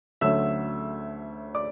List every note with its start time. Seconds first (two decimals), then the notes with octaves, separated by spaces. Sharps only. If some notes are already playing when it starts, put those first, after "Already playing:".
0.21 D2 D3 F#3 A3 C#4 E5 E6
1.55 D5 D6